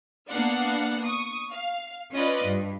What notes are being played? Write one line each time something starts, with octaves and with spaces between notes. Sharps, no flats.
A#3 B3 D4 F5 F#5
C#6 D#6
F5
C#4 F4 B4 D5 D#5
G2